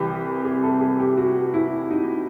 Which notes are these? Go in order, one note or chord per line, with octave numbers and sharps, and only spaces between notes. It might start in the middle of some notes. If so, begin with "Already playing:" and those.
Already playing: C2 C3 E3 G4
G#4
A4
G#4
G4
F#4
E4
D#4